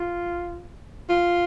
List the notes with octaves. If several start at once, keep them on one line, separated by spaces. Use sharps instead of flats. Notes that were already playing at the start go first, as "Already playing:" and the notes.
Already playing: F4
F4